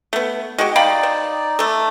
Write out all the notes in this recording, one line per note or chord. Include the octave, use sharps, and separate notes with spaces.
A3 B3
G#3 F#4 G4
D#4 D5 F5 G5 B5
C5
A3 A4